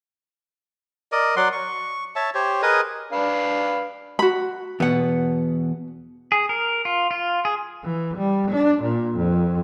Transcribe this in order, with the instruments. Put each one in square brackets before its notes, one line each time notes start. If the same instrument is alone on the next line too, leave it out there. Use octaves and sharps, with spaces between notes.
[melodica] A#4 D5 D#5
F#3 D5 F#5 C6
C#6
C#5 E5 A5
G4 C5 C#5
G#4 A#4 B4 D#5
[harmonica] D4 B4 F5
[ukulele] F#4 B5
[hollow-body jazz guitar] E2 B2 [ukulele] B4 F#5
[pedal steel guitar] G#4
A#4
F4
F4
G#4
[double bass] E3
G3
D4
A#2
F2